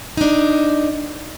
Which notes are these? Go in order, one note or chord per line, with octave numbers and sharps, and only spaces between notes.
D4 D#4